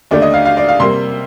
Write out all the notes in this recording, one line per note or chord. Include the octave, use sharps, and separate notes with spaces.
D#2 D3 A3 D5
D#5
F5
F5
D5
F5
C3 G3 A#3 C6